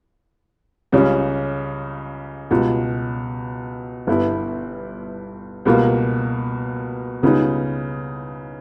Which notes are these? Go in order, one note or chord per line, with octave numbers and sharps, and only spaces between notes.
C#2 C#3 G3 C#4
C#2 B2 G3
G1 G2 G3 B3 E4
C#2 B2 G3 A#3
C#2 C#3 G3 B3 D#4